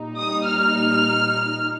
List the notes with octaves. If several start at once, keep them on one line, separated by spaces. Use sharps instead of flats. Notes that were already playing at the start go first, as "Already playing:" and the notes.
Already playing: A#2 G3 D#4
D#6
F6